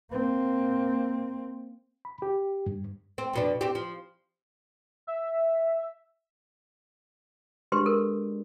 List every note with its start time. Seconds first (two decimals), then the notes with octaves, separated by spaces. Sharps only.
0.10 A#3 C4
2.05 B5
2.22 G4
2.66 G2
3.18 C4
3.33 F2 B2 D4
3.61 C4 G4
3.75 F3
5.07 E5
7.72 G#3 D4 G4 B4 C6
7.86 A4 A#4